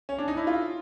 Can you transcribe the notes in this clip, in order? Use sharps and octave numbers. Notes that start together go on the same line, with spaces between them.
C#4
D4
D#4
E4
F4